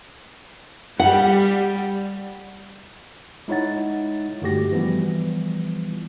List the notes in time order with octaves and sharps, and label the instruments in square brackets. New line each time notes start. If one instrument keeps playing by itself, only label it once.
[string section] G3 [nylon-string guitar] F#5
[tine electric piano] G#3 D#4 E4 C#5 F#5 A6
G2 D3 A3 F#4 G4 A#6
E3 F3 G3 B3